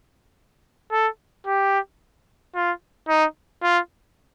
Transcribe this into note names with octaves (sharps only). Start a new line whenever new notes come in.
A4
G4
F4
D#4
F4